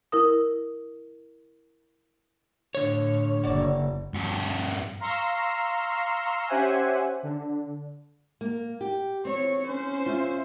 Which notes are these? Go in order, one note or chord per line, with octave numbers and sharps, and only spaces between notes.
E4 A#4 D#6
A2 D3 C#5
F#1 F#4 D5
G2 F#4
F5 A#5 C6 C#6 E6
C#4 G4 C5 E5 F#5 G#5
D3
A#3
G4
C4 C#5
C#4 C5
F4 E5